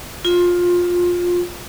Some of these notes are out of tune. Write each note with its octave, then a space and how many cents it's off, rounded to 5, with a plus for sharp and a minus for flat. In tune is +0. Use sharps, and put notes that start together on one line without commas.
F4 +15